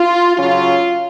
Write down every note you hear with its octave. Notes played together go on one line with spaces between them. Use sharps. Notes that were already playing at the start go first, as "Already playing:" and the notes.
Already playing: F4
C#3 F#3 C#4 F4